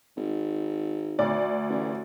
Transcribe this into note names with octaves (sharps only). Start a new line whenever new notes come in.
G#1
D2 D5
A1